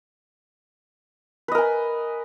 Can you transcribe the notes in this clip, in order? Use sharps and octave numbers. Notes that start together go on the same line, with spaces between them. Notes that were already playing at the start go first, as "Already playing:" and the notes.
A#4 B4 D#5 G#5